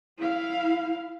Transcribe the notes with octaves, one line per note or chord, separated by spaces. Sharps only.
E4 F5